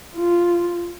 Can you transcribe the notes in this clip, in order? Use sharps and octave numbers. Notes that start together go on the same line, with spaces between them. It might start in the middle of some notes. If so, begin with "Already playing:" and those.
F4